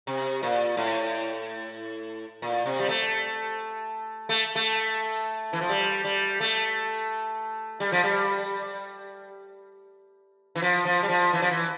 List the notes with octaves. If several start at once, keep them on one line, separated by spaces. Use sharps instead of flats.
C3
A#2
A2
A#2
C3
G3
A3
A3
A3
E3
F3
G3
G3
A3
G3
F3
G3
E3
F3
F3
G3
F3
E3
F3
E3